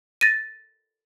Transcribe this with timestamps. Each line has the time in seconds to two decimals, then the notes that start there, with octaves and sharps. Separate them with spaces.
0.21 A6 A#6 D#7